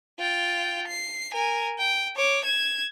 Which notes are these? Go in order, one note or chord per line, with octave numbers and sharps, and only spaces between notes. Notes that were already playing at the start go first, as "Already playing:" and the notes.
F4 G5
C7
A#4 G#5
G5
C#5 D6
G#6 E7